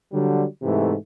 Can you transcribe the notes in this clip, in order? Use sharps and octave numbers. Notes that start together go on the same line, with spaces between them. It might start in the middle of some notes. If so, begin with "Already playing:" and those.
D3 F#3 G3
G#2 C3 E3 A3